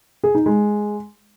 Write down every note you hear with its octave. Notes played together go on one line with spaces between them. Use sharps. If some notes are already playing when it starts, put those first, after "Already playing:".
G#4
D#4
G#3